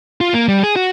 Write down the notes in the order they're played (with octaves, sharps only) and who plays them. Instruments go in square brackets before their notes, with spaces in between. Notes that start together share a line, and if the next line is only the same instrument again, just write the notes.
[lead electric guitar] F4
A#3
G3
G#4
F#4